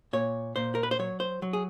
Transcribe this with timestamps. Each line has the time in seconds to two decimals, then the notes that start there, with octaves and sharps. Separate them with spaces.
0.13 A#2 C#5
0.56 A#2 C5
0.75 A#4
0.83 B4
0.91 C5
0.99 F#3 C#5
1.20 C5
1.42 F#3
1.53 G#4